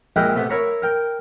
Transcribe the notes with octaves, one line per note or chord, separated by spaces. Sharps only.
A#1 G#3 E4 A#4 F#5 G5
C3 A3 B3
E4 A#4 C#5 A#5 B5 C#6
A#4 G5